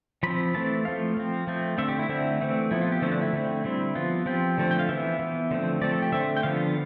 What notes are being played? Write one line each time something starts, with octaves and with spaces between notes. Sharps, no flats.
F3 C4 B5
E3 A3 C4 A5
F3 A3 C4 F5
F3 C4
F3 A3 C4
D3 A3 C4 E5
G4
E4
D3 A3 C4
E3 A3 C4
F3 B3 E4
F4
G4
D3 F3 A3 C4 E4
D4
E4
D3 A3 C4
D3 G3 C4 E4
F3 B3 F4
F3 C4 G4
D3 F3 A3 C4
G5
F5
E3 B3 E5
E3 B3
D3 F3 A3 C4
F3 A3 C4 D5
A4
G4
D3 A3 C4 E5
G5
D3 F3 B3 F5